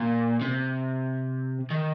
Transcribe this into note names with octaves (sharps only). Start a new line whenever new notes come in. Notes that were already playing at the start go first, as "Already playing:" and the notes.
Already playing: A#2
C3
D#3